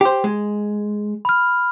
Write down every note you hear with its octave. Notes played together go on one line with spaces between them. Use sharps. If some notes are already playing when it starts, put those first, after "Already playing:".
G4 C5
G#3
B5 F6